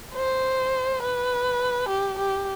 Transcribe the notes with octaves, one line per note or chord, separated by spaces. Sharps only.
C5
B4
G4
G4